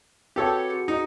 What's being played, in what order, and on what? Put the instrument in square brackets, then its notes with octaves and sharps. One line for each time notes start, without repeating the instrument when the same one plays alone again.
[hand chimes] C4 F#4 B4 [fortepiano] G4 A4 C#5
[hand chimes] F#4 G#4 C#7
[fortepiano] D#4